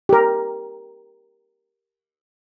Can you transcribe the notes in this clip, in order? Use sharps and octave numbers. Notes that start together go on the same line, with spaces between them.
G4 A#4